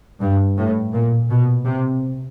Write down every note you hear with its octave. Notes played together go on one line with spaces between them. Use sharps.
G2
A2
A#2
B2
C3